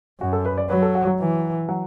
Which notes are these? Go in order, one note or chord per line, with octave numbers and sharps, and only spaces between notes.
F#2 F#4
A4
B4
D5
F#3 B4
A4
F#4
F#3
E3
F#3